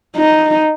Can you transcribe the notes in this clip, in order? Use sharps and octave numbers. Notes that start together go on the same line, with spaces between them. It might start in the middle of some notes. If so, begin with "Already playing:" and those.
D#4